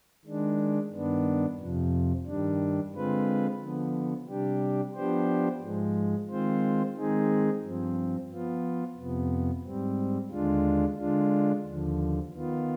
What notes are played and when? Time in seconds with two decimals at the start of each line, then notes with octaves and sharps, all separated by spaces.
0.25 D#3 G#3 D4
0.92 G2 D#3 B3 D4
1.59 F2 C3 F3
2.26 G2 D#3 G3 D4
2.94 D3 G#3 C4 F4 B4
3.60 D3 F3 B3
4.28 C3 G3 D4 G4
4.94 F3 B3 D4 G4 C5
5.62 G#2 F3 G#3
6.29 D#3 G#3 C4 F4 C5
6.96 D#3 G#3 C4 D#4 G#4
7.63 G2 F3 C4
8.29 F3 B3 F4
8.97 F2 C3 F3 B3
9.64 G#2 G3 C4
10.31 D#2 D3 G#3 D4 F4
10.98 D3 G#3 D4 F4
11.66 D#2 D3 F3
12.33 D#3 B3 F4